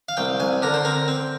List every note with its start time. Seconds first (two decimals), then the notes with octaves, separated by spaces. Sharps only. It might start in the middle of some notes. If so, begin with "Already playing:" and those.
0.09 F5
0.17 C2 G5
0.40 C2 G#5
0.62 D3 A#4
0.74 C5
0.85 C4 A#4
1.08 C4